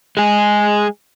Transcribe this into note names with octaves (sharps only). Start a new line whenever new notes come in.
G#3 G#4